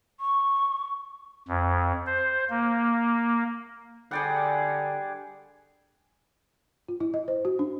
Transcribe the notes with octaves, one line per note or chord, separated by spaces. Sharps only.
C#6
F2
C5
A#3
D3 G3 G#4 D5 F#5 G5
F4
E4
D#5
C5
F#4
D4